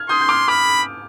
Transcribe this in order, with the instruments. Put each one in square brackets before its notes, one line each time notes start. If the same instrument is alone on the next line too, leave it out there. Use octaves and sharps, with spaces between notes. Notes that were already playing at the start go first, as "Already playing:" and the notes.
Already playing: [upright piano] F6 G#6
[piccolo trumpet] C6 [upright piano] D#6 G6
[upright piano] G6
D6 F6
[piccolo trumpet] B5 [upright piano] D6 F6